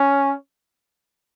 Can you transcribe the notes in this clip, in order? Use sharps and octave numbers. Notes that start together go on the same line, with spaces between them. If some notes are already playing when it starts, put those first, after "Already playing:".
Already playing: C#4